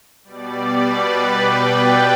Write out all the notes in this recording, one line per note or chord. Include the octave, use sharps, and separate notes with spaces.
B2 G3 D5
B4
G5
A5